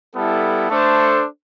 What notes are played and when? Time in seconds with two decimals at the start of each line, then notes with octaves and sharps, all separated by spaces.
0.15 G3 B3 E4 A4
0.70 A3 D4 A4 C5